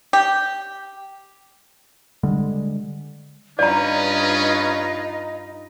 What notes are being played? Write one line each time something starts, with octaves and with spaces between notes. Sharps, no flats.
G4
D3 G3 G#3
G2 C#4 D#4 F4 B4 D5 D#5 A#5